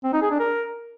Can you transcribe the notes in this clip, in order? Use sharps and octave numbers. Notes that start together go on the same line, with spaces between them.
C4
D#4
G#4
D4
A#4